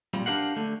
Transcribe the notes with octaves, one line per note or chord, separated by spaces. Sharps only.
A#2 G3 C4
D4 D#4 G4 A#4 F5 F#5
D3 A3